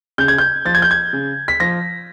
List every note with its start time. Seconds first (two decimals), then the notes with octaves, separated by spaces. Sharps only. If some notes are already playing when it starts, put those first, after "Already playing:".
0.18 C#3 G6
0.28 G#6
0.38 G6
0.65 F3 A6
0.75 G#6
0.82 G6
0.91 G#6
1.13 C#3
1.48 B6
1.60 F3 A#6